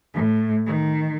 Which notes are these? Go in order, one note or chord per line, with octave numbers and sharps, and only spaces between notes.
A2
D#3